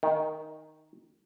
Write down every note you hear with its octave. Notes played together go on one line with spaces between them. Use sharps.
D#3